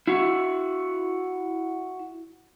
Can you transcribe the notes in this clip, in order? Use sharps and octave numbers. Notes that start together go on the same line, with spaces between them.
E4 F#4